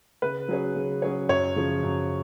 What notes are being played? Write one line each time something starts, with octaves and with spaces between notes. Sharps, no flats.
C#3 B4
F#3 C#4 G#4 C#5
C#3
F#3 C#4 G#4 C#5
F#2 C#5
C#3 F3
F#2